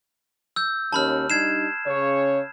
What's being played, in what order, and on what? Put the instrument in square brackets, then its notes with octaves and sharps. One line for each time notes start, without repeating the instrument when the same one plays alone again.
[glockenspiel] E6 G6
[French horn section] D#2 C#4 [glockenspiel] A5 B5 F6
[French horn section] G3 D4 D#4 [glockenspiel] G#6 C7 E7
[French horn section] C#3 C#5